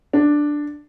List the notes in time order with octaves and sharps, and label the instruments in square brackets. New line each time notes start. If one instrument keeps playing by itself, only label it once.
[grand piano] D4